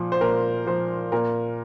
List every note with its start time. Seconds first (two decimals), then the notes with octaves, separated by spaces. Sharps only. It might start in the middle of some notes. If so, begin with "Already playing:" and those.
Already playing: A#2 F3
0.12 C5
0.21 A#2 A#4
0.66 F3 C5
1.12 A#2 A#4